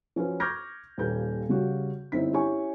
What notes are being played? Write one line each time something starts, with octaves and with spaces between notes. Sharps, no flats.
F3 C#4 F#4 B4
C#6 D6 F6 G6 G#6 A#6
D#1 D#2 A#2 B4 G6
C#3 G3 F#4
G1 C4 D#4 E4 B6
C#4 E4 G4 C#5 G#5 C#6